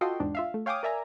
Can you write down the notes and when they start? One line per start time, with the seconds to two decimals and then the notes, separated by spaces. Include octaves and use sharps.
0.01 F4 F#4 A4 D#5 G5 C6
0.20 E2 G#2 D4
0.35 F4 E5 F5
0.54 A3
0.66 C#5 F5 G5 G#5 D6 D#6
0.83 A#4 D5 E5 G#5 A#5